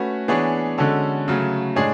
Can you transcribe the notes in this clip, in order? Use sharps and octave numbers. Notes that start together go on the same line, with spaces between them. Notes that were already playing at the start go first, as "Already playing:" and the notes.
Already playing: A3 C#4 F#4 B4
E3 B3 D4 G#4 C#5
D3 G#3 C#4 F#4 A4
C#3 F#3 A3
A2 G#3 D4 G#4 C#5